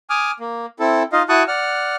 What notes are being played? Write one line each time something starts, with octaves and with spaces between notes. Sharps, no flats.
G#5 D6 D#6 F6
A#3
C4 E4 A4
D#4 F4 D#5 F5
E4 F#4 A5 C#6 D#6 F#6
D5 F#5 F6